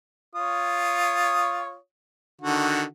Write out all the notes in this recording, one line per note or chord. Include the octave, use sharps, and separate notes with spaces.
F4 C#5 D#6
D3 D#3 F#4